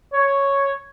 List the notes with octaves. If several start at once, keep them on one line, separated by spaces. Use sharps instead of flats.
C#5